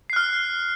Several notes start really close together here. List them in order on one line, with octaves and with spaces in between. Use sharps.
C7 F#6 F6